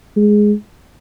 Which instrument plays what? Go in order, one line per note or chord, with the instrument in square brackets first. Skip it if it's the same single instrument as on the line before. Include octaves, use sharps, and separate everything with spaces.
[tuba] G#3